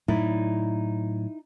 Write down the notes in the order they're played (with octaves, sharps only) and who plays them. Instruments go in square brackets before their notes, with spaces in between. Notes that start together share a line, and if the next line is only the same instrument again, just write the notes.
[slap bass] A2 F#3 [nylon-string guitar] D#4 E4 D5